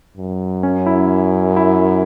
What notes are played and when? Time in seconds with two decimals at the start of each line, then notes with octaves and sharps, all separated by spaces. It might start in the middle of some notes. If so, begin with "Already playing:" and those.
0.17 F#2
0.63 C#4
0.86 E4
1.56 E4